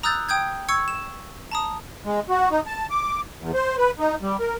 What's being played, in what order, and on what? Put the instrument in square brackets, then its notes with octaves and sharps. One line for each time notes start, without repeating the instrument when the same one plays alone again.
[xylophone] A#5 D#6 E6 F#6 G6 A6
G5 D#6 G6 G#6
C#6 E6 G#6 C#7
E7
A5 A#5 D#6
[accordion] G#3
F#4
D#4
A5
D6
E2
C5
B4
D#4
G3
A#4